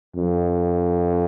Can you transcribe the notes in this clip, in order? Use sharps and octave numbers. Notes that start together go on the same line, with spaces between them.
F2